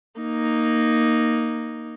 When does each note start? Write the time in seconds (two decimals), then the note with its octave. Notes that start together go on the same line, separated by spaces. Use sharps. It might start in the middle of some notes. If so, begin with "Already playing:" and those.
0.20 A#3 D#4